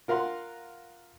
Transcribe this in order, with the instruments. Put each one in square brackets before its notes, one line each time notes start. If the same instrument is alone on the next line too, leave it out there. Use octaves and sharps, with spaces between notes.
[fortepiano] F4 A#4 F5 F#5 C6